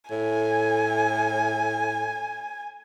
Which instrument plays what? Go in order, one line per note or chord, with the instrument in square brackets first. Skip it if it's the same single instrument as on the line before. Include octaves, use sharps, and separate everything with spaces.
[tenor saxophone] A2 [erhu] G#5